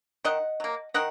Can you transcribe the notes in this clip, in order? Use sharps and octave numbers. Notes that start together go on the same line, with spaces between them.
D#3 D#5 F#5
F#3 A#3
D#3 D#5 F#5